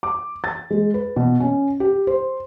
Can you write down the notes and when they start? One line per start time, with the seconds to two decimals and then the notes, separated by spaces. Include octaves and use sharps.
0.03 D6
0.44 A6
0.71 G#3
0.94 B4
1.16 B2
1.40 C#4
1.80 G4
2.07 C5